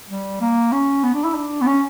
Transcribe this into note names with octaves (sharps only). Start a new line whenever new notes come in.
G3
A#3
C#4
B3
D4
E4
D4
B3
C#4